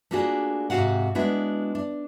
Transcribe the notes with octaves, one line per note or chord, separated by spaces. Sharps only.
A3 A#3 D4 F4 F#4 G#4
G#2 C3 C4 F#4 F5 F#5
G#3 B3 D4 E4 F#4
D4